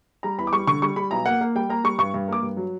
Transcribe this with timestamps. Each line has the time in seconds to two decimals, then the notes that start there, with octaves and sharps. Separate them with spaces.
0.23 G3 A#5
0.38 E2 B5
0.47 D6
0.53 G3 C#6
0.67 D3 C#6
0.82 G3 C#6
0.96 G3 B5
1.11 B1 A#5
1.25 A#3 F#5
1.41 A#3
1.55 G3 G5
1.69 A#3 A#5
1.84 G3 C#6
1.98 G2 C#6
2.14 G2
2.28 A#3 D6
2.42 G2
2.57 F#3